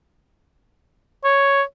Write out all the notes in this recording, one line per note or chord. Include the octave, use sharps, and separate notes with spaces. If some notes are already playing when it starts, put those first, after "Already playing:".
C#5